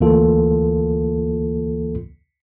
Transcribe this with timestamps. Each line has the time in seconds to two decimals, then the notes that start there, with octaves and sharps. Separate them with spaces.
0.01 D2 E3 A#3 F4 A4